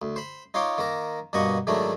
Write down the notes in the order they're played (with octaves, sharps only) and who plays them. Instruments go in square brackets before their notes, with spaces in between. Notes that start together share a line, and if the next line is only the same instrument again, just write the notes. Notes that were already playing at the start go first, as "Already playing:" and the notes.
[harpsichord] D2
C5 B5
D#4 F4 C#5 C6 D6
D#3 A#3 A#4
G2 B2 A#3 D#5 F#5 C#6
G#2 D#3 F#3 A3 D4 E4